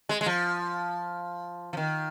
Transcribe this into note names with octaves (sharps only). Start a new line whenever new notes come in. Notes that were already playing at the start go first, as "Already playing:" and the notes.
G#3
G#3
F3
F3
D#3